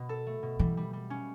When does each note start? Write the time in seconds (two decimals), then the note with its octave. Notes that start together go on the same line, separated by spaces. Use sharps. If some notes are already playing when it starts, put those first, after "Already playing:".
Already playing: B2
0.09 A4
0.27 A3
0.43 B2
0.59 E3 G3
0.77 G3
0.93 G3
1.10 C#4